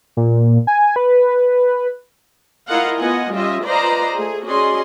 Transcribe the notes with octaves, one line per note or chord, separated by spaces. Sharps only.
A#2
G#5
B4
E4 F4 A#4 D#5 F5 F#5
B3 F4 D#5 F#5 G#5
G3 C#4 F4 G4 D#5 E5
F4 B4 C5 D5 D#5 A#5
A3 G#4
C#4 F#4 G#4 D5 D#5 C6